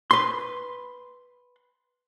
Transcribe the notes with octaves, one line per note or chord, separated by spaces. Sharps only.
B4 C6